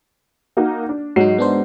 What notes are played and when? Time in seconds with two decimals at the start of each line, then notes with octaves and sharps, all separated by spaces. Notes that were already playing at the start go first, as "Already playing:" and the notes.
0.57 A#3 D#4 F#4
0.89 D4
1.16 G#2 F#3 D#4 F#4 C7
1.38 B3 D4 C5